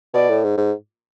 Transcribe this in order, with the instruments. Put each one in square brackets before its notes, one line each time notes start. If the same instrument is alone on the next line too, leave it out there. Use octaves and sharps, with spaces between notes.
[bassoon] B2 [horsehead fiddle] D5
[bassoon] A2
G#2
G#2